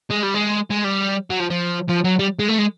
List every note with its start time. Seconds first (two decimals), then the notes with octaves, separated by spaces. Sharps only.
0.11 G#3
0.24 G3
0.35 G#3
0.71 G#3
0.84 G3
1.30 F#3
1.40 F3
1.50 F3
1.89 F3
2.04 F#3
2.19 G3
2.39 G#3
2.48 A3
2.58 G#3